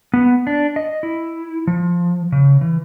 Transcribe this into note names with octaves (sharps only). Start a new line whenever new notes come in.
B3
D4
D#5
E4
F3
C#3
E3